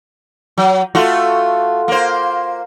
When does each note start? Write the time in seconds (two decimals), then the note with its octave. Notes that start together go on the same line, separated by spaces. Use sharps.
0.58 F#3
0.95 A3 F4 F#4
1.88 A#3 C5